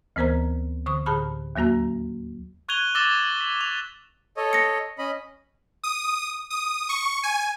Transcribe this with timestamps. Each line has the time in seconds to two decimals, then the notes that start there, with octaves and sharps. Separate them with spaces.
0.16 D2 E3 B3 A#4 C5 A#5
0.86 D3 C#6 D#6
1.06 A2 D3 G#4 A5 B5 F6
1.56 D#2 F#3 A#3 F#4 A#5
2.69 C#6 F#6 G#6 D#7 F7 G7
2.95 D6 E6 A6 A#6 E7 G7
3.41 B6
3.61 D6 F7
4.37 A4 C#5 D#5
4.53 A#6 C#7
4.98 C#4 D#5 B5
5.84 D#6
6.50 D#6
6.89 C#6
7.23 G#5